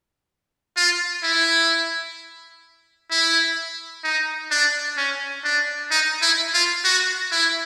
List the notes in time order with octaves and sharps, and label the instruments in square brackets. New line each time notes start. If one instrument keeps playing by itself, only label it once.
[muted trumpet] F4
E4
E4
D#4
D4
C#4
D4
D#4
E4
F4
F#4
E4